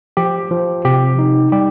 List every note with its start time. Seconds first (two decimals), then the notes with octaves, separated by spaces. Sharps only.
0.17 F3 G4
0.51 F3
0.85 C3 G4
1.19 D#4
1.52 G3 G4